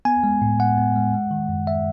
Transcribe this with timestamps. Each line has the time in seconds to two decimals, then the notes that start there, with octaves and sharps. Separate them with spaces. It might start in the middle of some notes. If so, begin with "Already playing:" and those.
0.05 B3 G#5
0.24 G#3
0.42 A2
0.59 A2 F#5
0.78 B3
0.96 G#3
1.14 G#3
1.31 D#3
1.49 F#2
1.67 E5